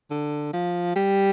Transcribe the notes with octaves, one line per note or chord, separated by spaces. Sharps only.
D3
F3
G3